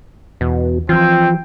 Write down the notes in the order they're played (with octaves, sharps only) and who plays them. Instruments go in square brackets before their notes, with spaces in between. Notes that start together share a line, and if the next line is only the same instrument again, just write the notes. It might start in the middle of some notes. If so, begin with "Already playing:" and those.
[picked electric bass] E2 [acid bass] B2
[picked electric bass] E3 F3 [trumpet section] C4 G5 [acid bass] F4